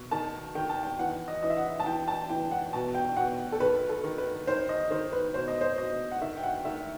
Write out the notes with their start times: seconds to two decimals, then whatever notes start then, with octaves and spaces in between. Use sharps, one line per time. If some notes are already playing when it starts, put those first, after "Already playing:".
Already playing: B2
0.11 D#3 A5
0.55 D#3 G5
0.69 A5
0.83 G5
0.99 E3 F#5
1.28 D#5
1.42 E3 D#5
1.50 E5
1.57 F#5
1.80 A5
1.86 E3 G5
2.08 A5
2.29 E3 G5
2.51 F#5
2.73 B2 A5
2.95 G5
3.17 B2 F#5
3.52 A4
3.60 D#3 B4
3.89 A4
4.04 D#3
4.18 B4
4.47 D#3 C5
4.69 D#5
4.91 D#3 C5
5.12 B4
5.34 B2 C5
5.48 D#5
5.61 C5
5.78 B2 D#5
6.11 F#5
6.21 D#3 E5
6.37 G5
6.43 F#5
6.65 D#3 E5